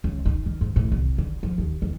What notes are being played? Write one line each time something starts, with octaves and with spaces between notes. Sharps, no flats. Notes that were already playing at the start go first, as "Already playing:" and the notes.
C#2
D#4
D#3
G#2
A2
C2
D3
F3
D#2
E2